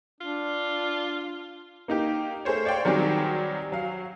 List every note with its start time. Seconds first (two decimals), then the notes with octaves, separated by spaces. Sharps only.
0.21 D4 F4
1.88 A#3 D#4 G4
2.45 A3 G#4 A#4 C5 C#5
2.65 C#5 D5 F5 G5 C6
2.85 D#3 F#3 G3 C4 G4 G#4
3.72 F#3 F5